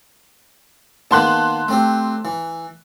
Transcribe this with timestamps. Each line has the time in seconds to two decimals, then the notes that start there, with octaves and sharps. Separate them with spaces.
1.11 D#3 A#3 B3 A5 C6 F#6
1.68 A3 C4 G4
2.25 E3